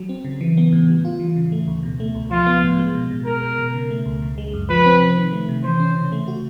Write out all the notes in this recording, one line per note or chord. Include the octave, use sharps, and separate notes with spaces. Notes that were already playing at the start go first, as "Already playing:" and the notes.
Already playing: F#3
C4
C#3
E3
B3
A2
G3
F4
E3
C#3
A3
D2
B2
A3
C#2
F3 F4
B3
A2
G#3
B2
B2
G#3 A#4
B2
B2
C#3
A3
C#2
C#3
G#3
F#2
F3 B4
C4
C3
D#3
A3
C3
E3 C5
C#4
C#3
A3
F#4